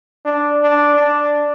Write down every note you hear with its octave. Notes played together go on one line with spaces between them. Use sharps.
D4
D4
D4